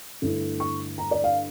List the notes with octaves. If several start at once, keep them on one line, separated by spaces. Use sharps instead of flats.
G2 D3 A3 E4
C#6
A#5
D5
F5